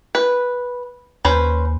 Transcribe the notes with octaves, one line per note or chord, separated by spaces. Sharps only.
B4
D#2 C#4 B4 C5